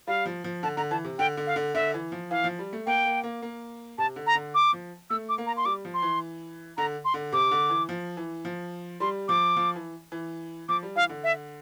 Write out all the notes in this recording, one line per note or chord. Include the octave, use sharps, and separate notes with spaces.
G3 F5
F3
F3
D3 A5
D3 A#5
E3 A5
C3
D3 G5
D3
F5
D3
D3 E5
E3
F3
E3 F5
F3
G3
A3
A#3 G5
A#3
A#3
A#3
C3 A5
D3
A#5
D3
D6
F3
A3 E6
D6
A#3
A#5
C6
G3 D6
F3
C6
E3
D3 A#5
C6
D3
C3 D6
D3
E3
F3
E3
F3
G3 C6
F3 D6
F3
E3
E3
F3 D6
G3
E3 F5
D3
E5